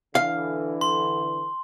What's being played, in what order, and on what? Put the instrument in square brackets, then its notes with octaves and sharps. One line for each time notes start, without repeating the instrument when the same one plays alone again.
[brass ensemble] D3 E3 [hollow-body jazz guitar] F5
[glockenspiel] C6